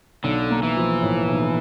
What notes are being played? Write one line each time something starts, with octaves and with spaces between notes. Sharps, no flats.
B1 D3
A#3
E3
F3
A2
B1